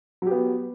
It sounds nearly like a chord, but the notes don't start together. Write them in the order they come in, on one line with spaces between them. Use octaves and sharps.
F#3 G4 B3